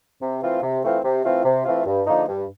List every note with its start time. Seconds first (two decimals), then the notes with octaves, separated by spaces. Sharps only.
0.22 C3
0.42 E3 A3 C4 F4
0.63 C3
0.84 E3 A3 C4 F4
1.04 C3
1.24 E3 A3 C4 F4
1.45 C3
1.65 E3 A3 C4 F4
1.86 G2
2.07 D3 F3 A#3 D#4
2.28 G2